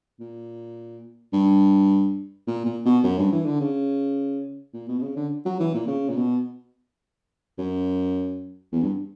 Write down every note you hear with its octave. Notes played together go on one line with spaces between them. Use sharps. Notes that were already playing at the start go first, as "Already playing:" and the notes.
A#2
G2
A#2
A#2
B2
F#2
G2
E3
D3
C#3
A#2
B2
B2
C#3
D3
F#3
E3
A#2
C#3
A#2
B2
F#2
E2
G2